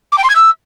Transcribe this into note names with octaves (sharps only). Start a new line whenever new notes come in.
D6
G5
C6
G#6
E6